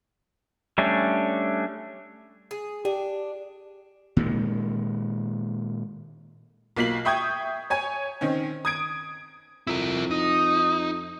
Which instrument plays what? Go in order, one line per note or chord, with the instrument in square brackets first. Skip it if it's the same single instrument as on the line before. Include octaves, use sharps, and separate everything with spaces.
[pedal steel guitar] G3 A3 C#4 D4
[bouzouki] G#4
[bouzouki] D4 [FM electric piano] G4
[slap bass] A#2 D#3 G#3
[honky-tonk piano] B1 A#3 F4 B6 C7 F#7
E5 G5 C#6 D#6 G6 G#6
C#5 G#5 G#6
D#3 C4 C#4
D#6 G#6 D7
[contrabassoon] F2 [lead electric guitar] E4 A#4
[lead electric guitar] D#4 [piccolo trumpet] D#6